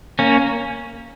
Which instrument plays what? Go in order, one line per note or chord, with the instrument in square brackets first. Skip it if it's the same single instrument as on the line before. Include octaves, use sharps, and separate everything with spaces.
[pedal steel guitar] A#3 C#4